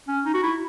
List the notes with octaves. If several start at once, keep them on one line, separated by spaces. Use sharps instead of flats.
C#4
D#4
F#4
E4